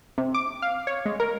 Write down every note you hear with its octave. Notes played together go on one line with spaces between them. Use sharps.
C3
D6
F5
C#5
G#3
A#4